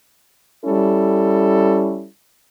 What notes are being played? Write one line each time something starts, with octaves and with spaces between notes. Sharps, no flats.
G3 C#4 E4 A4